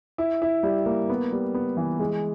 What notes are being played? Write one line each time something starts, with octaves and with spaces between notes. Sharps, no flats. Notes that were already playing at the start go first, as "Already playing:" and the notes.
E4
E4
G3
A#3
B3
G3
B3
E3
G#3